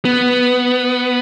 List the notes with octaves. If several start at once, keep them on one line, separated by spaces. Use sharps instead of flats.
B3